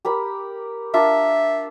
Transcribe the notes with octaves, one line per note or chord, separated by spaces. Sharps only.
G4 A#4 B5
D4 F4 A#4 E5